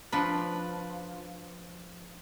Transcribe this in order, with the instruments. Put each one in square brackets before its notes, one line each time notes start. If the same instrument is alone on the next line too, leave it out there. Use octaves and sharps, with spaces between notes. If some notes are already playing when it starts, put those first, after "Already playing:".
[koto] F3 D4 B4